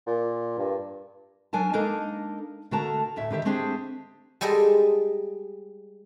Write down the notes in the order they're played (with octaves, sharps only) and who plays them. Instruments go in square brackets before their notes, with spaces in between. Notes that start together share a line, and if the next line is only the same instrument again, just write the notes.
[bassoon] A#2
G2
[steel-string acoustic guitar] F#3 D4 A#4 G#5 A5
G#3 A#3 D4 D#4 A4 A#4
D3 A3 F#4 A#4 A5 A#5
D2 A2 E5
D3 D#3 G4 E5
A3 C4 D4 G4 G#4
[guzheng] G3 G#3 G#4 A4 C5 D#5